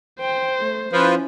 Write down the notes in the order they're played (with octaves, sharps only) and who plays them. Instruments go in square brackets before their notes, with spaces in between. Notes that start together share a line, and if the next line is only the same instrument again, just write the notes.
[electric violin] C5 [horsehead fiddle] G5
[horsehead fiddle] A3
[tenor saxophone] F3 [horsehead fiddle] C#4 E4 [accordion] F4 B4 C5